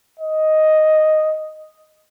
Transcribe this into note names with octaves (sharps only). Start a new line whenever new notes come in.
D#5